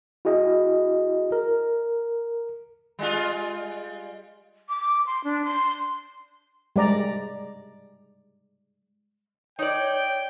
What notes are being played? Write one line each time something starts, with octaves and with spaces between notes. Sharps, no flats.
E4 F#4 G#4 D#5
A#4
G3 G#3 F4
D6
C6
D4
C6
G3 G#3 D5 A#5
D#4 C#5 D5 G5